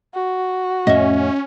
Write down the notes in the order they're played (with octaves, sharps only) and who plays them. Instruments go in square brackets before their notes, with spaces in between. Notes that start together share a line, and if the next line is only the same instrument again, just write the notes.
[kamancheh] F#4
[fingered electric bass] F2 A2 A3 [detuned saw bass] C#4 [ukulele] D#5 E5